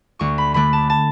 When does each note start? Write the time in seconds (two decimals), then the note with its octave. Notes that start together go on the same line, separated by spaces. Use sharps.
0.19 D2 C#6
0.38 B5
0.54 D3 A3 D4 B5
0.73 A5
0.90 A5